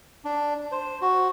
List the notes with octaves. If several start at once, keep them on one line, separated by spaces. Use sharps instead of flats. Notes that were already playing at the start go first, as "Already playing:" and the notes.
D4
C5
F#4